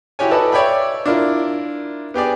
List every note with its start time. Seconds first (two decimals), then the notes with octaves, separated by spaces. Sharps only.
0.19 E4 F#4 G4 C#5 G#5
0.31 A4 B4 D5 D#5 A5
0.52 C#5 D5 E5 G5 B5
1.06 D4 E4 F4 A#4
2.14 B3 G4 G#4 D5